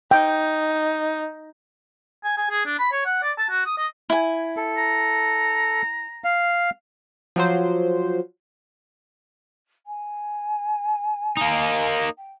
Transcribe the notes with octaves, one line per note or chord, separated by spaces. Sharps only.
D#4 G5
G#5
G#5
G#4
D4
B5
C#5
F#5
D5
A5
F#4
D#6
D#5
E4 G#5
A4
A#5
F5
F3 F#3 C5
G#5
A#3 D#4
G5